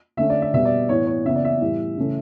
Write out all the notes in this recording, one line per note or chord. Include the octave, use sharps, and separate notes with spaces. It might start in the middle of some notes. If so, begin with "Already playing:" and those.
D3 A3 C#4 E5
D5
E5
B2 G3 B3 E5
D5
A2 E3 B3 C#5
C#5
C#3 E3 B3 E5
D5
E5
A2 E3 G3
C#3 E3 A3 C#4